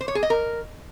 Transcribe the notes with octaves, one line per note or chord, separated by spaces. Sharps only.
C5
C#5
G#4
D#5
A#4